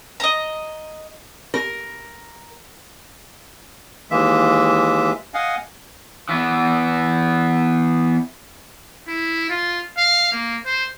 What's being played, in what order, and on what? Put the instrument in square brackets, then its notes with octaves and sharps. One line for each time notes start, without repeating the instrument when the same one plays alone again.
[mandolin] D#5 A#5
[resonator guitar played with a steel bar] A#4
[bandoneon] D#2 E3 G#3 A#3 E5
D#5 F5 F#5 G#5
[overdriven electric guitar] E3 B3
[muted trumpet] E4
F4
F5
A#3
C5